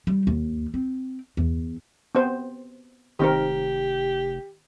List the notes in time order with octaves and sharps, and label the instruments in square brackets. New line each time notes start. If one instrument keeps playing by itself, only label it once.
[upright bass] G3
D#2
C4
E2
[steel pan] B3 C4 C5
[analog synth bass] F1 [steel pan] D#3 C4 A#4 [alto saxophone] G4